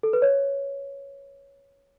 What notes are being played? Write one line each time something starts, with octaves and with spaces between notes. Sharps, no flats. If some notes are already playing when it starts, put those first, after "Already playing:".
A4
B4
C#5